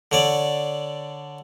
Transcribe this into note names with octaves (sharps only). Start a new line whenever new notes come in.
D3 C#5 D5